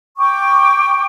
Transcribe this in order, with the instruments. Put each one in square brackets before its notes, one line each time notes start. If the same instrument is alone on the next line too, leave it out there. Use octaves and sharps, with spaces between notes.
[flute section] G5 C#6 D6